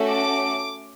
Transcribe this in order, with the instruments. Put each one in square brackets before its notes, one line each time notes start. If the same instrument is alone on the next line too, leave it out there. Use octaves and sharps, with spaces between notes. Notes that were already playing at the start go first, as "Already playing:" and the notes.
Already playing: [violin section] A3 C#4 F#4 A4
D6